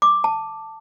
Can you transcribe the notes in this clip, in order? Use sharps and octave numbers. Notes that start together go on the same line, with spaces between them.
D6
A5